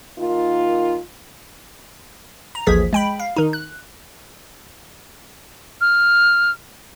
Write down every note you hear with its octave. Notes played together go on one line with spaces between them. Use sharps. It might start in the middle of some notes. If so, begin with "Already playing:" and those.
D#3 A#3 D#4 F4
A#5
A1 D#2 F3 G#4 G#6 B6
G#3 G5 B5
F5
D#3 D#4
F#6
F6